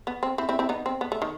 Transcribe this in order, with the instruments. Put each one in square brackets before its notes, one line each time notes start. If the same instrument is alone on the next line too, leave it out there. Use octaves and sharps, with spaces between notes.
[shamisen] B3
C4
C4 E4
C4 E4
C4 E4
B3 D#4
C4
B3
A3
D#3